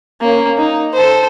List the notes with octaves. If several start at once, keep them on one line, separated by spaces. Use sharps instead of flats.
A#3 C#4
D#4
A4 C5